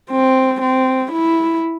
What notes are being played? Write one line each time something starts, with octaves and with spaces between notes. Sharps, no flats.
C4
C4
E4